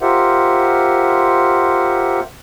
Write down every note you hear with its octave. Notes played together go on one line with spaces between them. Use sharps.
F4 G4 A#4 C5 E5 F#5